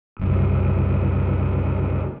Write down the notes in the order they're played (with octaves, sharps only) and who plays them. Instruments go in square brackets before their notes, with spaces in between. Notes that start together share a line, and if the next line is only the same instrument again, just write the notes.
[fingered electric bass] F#1 C2